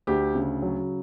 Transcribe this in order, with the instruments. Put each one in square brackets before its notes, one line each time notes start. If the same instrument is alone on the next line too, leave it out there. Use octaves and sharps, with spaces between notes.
[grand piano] D2 G4
C#3
F#3